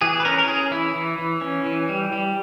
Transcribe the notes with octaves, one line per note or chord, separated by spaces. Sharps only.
E3 G#4
B4
C#4 A#4
A#4
C#4 G#4
E3 E4
E3
E3
C#4
E3
G3
G3